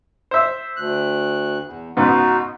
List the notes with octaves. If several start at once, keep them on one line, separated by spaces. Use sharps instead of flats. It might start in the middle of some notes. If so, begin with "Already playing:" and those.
C5 E5
D2 F#6
E2
G#2 C#3 B3 D#4 F#4